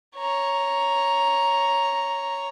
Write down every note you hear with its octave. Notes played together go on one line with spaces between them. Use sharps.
C#5 A#5